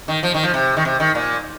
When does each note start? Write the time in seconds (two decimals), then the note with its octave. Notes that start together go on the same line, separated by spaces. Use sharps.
0.08 D#3
0.23 F3
0.34 D#3
0.43 F3
0.54 C3
0.77 D#3
0.85 C3
1.00 D#3
1.15 A#2